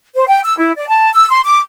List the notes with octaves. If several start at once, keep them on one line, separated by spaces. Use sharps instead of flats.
C5
G5
E6
E4
D5
A5
E6
C6
D6